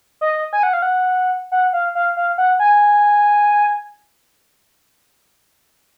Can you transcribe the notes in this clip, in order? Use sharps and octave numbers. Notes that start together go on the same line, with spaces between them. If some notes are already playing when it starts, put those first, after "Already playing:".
D#5
G#5
F#5
F5
F#5
F#5
F5
F5
F5
F#5
G#5